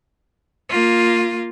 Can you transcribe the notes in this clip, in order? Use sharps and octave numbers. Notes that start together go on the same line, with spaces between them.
A#3 F4